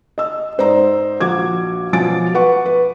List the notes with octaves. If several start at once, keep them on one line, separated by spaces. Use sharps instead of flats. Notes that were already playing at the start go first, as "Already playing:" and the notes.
D#5 E6
G#2 C5 D5 A#5
A#1 F#4 D6 G#6
B2 F3 F#3 G#5 A6 D7
B4 F#5 C#6
B4